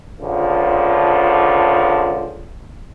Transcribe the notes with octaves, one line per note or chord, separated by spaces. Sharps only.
C#2 D3 F3